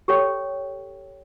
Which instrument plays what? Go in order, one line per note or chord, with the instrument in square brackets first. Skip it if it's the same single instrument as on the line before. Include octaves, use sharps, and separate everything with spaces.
[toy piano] G4 A4 C#5 G5